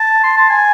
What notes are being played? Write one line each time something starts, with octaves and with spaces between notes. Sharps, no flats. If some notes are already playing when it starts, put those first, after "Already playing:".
Already playing: A5
C6
A5
G#5